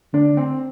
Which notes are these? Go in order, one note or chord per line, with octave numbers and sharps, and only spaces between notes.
D3 D4
C4